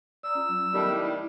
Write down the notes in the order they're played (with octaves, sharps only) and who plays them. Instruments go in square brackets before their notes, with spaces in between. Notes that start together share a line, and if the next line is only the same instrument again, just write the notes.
[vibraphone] D5 A#5 D#6 [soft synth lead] E6
[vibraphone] C#4 F4
F#3
[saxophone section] A2 D#3 G3 [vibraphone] B3 A5
[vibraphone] E4